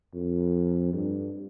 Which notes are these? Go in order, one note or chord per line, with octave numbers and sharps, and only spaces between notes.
F2
G2